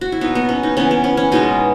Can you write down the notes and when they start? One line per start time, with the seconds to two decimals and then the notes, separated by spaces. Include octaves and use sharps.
0.01 F#4
0.12 E4
0.21 B2 F#3 B3 D#4
0.35 B3
0.49 C#4
0.63 D#4
0.77 E3 B3 C#4
0.91 B3
1.04 C#4
1.17 C#4
1.32 B2 G#3 B3 D#4